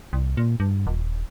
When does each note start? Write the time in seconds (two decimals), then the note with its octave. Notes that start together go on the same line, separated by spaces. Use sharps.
0.13 C2
0.37 A#2
0.60 G2
0.87 D#1